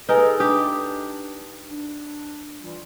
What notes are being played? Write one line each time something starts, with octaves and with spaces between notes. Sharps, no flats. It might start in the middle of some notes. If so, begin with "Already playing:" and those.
A#3 D#4 G#4 A4 B4 G#5
D4 G4 D#6
D4
E3 G3 F4